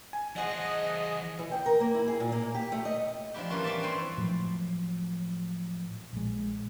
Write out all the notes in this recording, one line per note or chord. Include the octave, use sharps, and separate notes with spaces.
G#5
E3 G#4 C5 D#5 F#5
E3
G5
A#4
A#3
E4
G#4
A#2
A#3
G4
A3
D#5
F3 D4 E4 G4
E3 G3 A#3 C#4 F4
C4 C#4 D5 E5 A5
G2 C4 E4 C5 G#5
A2 F3 F#3
A#1 G#3